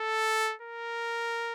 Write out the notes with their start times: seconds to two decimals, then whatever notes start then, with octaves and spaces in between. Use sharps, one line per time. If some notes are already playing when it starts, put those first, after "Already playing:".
Already playing: A4
0.62 A#4